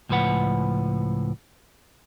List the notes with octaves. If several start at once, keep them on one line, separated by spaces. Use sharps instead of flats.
C#2 A2 F3 B4 F#5